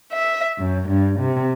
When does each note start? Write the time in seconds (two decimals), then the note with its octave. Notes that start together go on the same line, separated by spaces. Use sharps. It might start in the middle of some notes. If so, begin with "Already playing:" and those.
0.12 E5
0.57 F#2
0.88 G2
1.19 C3